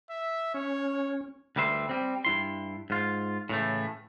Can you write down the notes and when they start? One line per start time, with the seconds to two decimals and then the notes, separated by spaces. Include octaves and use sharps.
0.10 E5
0.54 C#4 C#5
1.56 D2 G3 B4 E5 C6
1.89 G3 C4
2.25 G2 E4 C6
2.90 G#2 F4
3.49 A2 C#3 E3 A3